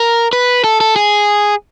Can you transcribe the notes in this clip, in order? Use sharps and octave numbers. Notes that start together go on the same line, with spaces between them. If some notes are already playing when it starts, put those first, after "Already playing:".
Already playing: A#4
B4
A4
A4
G#4